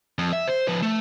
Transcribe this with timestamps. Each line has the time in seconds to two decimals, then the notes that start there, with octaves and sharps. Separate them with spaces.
0.19 F2
0.33 E5
0.48 C5
0.68 F3 B4
0.82 A3